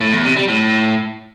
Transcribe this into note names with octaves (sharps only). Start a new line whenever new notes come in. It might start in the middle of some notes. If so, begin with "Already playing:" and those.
A2
E2
C3
G3
A2